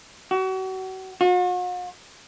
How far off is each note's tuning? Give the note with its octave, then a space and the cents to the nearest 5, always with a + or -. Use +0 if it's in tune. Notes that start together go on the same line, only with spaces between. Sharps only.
F#4 +35
F#4 -45